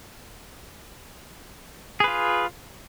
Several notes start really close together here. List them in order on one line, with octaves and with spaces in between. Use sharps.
G#4 B4 F4